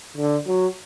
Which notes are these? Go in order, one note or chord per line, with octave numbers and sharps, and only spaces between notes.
D3
F#3